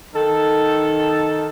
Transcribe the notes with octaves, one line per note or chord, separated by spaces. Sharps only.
D#3 D#4 A4